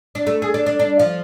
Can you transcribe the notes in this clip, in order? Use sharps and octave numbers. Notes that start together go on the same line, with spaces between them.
D4
A3
G#4
D4
D4
D4
F3